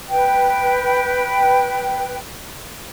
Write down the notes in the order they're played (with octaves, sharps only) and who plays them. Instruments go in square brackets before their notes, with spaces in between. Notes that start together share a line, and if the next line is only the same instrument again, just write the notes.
[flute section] B4 G5